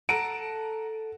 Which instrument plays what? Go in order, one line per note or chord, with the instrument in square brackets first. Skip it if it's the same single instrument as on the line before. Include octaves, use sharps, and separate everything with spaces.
[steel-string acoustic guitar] A4 A5 [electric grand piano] F#5 A#5 [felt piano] D7